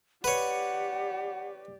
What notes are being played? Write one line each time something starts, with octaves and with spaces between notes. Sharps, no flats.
G4 B4 C#5 D5 F#5